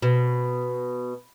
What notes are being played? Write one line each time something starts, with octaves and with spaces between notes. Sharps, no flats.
B2